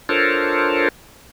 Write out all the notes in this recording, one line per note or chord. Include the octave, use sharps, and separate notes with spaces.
D4 F4 A4 A#4 C5 C#5